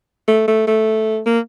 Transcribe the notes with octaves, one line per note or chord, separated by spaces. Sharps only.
A3
A3
A3
A#3